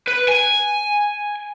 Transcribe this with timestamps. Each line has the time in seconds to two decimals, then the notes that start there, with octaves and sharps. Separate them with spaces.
0.07 B4
0.28 G#5